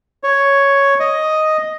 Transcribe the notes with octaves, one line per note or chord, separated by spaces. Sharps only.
C#5
D#5